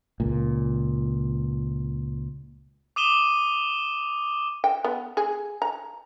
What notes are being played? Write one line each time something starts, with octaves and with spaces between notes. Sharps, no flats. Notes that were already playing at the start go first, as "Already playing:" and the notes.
C#2 A#2
D6 D#6 D#7 E7 G7
G5
B3
G#4
A#5